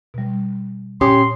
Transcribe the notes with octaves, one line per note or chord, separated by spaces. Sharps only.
B2 G3
A#2 C#4 G4 C6 D6 D#6